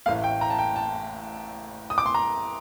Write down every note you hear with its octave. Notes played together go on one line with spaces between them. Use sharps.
A1 A2 A3 F5
G5
A#5
A5
G5
A5
D#6
D6
C6
A#5